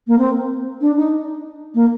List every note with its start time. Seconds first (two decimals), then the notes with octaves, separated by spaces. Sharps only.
0.07 A#3
0.19 C4
0.81 D4
0.97 D#4
1.75 A#3